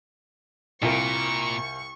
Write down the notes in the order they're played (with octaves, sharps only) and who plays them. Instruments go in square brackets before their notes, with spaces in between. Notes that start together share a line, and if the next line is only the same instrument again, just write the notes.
[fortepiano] C2 F4 A#4 [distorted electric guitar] A#2 [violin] C#6